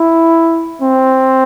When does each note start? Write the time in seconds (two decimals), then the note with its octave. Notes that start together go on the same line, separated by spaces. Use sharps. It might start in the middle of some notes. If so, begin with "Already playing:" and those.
Already playing: E4
0.81 C4